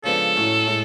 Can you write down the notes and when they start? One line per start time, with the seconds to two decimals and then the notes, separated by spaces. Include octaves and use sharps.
0.04 C#3 F3 G#3 B3 D4 A4
0.37 A2 F#3 C#4
0.67 A2 G#3